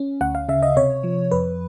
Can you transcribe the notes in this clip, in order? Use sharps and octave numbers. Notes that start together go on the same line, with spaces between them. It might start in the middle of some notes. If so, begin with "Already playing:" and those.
Already playing: C#4
D2 F#5
F5
C#3 E5
D#5
C3 C#5
F3
F2 B4